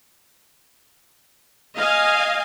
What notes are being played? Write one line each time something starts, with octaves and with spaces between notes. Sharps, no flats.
D#5 F5 G#5